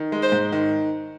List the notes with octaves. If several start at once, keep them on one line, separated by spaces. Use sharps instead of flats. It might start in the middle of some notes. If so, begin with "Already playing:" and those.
Already playing: D#3
G#3
C5
G#2
D#3